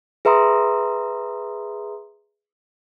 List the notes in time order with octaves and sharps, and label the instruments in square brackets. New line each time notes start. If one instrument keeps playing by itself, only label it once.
[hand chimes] G#4 B4 E5 A#5 C6 D#6